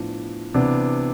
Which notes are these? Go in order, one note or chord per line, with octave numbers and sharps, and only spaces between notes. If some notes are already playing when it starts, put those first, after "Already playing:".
Already playing: A2 F3 B3 D4
C3 E3 B3 D4